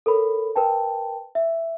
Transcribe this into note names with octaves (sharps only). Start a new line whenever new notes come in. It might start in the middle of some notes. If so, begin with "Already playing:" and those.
A4 A#4 C#5 B5
A#4 B4 G5 A5
E5